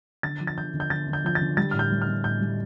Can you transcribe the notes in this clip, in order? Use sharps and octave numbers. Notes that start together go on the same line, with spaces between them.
D3 A6
F3
A6
D3 G6
D3
G6
D3 A6
D3
G6
F3 G6
A6
D3
G3 A6
A2 F6
G6
G3
F6
G3
A2 G6
G3